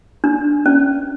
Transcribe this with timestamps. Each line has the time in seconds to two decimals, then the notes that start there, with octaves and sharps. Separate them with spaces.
0.24 D4
0.66 C#4